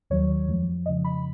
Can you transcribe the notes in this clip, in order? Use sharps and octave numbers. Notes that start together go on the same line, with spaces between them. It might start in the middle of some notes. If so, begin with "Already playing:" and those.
D#2 D#3 F#3 C#5
F2 F3 G#3
F2 C#3 F3 D#5
B5